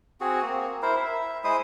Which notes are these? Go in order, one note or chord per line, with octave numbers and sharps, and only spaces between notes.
C4 F#4 G#4
A#3 C4
E4 A#4 C5
E5
G#3 E4 C5 D#6